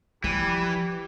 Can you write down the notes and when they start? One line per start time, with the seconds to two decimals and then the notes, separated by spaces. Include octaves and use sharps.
0.24 E3 F3 G3